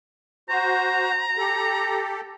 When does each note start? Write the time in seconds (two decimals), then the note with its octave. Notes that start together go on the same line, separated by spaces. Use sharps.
0.49 F#4 C5 A#5
1.37 G4 A4